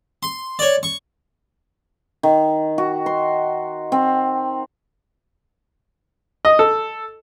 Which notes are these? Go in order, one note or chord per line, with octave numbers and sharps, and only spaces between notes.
C6
C#5 D5
C#6
D#3
F#4
C6
C4
D#5
A4